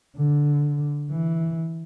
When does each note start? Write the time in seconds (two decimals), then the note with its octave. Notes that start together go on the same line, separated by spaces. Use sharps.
0.16 D3
1.11 E3